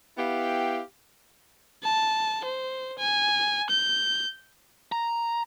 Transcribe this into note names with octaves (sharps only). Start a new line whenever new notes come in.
B3 E4 G4 F5 G5
A5
C5
G#5
G6
A#5